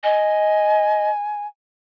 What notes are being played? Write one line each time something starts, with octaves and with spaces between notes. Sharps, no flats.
D#5 G#5